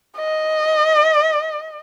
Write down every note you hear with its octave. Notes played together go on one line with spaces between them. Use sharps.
D#5